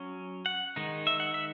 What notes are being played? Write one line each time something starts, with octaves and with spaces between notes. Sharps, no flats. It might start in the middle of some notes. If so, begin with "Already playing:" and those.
Already playing: F#3 C#4
F#5
D#3 G#3 D#4
E5
F#5
E5